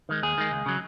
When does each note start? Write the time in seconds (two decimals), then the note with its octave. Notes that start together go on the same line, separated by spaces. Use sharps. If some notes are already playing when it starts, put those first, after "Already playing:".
0.09 D#3 G#3
0.23 D#2 G#4
0.38 D#3 G#3
0.51 C#2
0.66 C#3 F#3